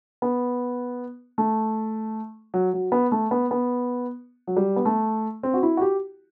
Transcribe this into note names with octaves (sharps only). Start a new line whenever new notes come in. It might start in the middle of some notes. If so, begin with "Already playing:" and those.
B3
A3
F#3
F#3
B3
A3
B3
B3
F#3
G3
B3
A3
C4
F#4
E4
F#4
G4